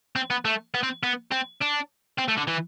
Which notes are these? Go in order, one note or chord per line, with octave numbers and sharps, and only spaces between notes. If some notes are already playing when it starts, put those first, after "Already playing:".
C4
B3
A3
B3
C4
B3
C4
D4
C4
A3
D3
E3